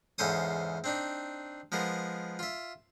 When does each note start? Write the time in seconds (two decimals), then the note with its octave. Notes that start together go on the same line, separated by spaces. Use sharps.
0.18 E2 G#2 C#3 A4 C5 D#6
0.84 C4 D4 D#4
1.72 F3 G#3 B3 A#4
2.39 F4 E5